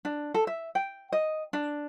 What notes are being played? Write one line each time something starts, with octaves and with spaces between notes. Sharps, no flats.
D4
A4
E5
G5
D#5
D4